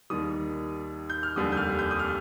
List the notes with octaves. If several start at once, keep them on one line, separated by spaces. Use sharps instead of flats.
D#2 D#3 G3 D#6
G6
F6
F1 D#2 D3 G3 D#6
G6
F6
G6
D#6
F6